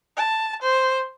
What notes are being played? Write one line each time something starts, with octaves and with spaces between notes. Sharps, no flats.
A5
C5